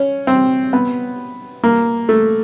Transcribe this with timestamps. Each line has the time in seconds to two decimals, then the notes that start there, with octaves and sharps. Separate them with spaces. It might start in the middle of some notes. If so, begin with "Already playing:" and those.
Already playing: C#4
0.27 C4
0.73 B3
1.64 A#3
2.09 A3